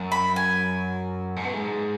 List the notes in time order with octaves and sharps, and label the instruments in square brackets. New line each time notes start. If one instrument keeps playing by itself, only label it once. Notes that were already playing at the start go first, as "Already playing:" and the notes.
Already playing: [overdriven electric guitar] F#2
[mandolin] B5
G#5
[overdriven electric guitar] G#2
B2
G#2